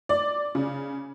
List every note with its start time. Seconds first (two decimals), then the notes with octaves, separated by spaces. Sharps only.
0.09 D5
0.55 C#3